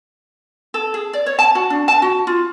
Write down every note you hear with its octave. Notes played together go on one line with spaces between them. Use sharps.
A4
G#4
D5
C#5
A5
F#4
D4
A5
F#4
F4